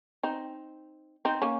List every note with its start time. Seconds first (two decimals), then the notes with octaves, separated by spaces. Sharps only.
0.23 C4 D#4
1.25 C4 D#4
1.42 A#3 C#4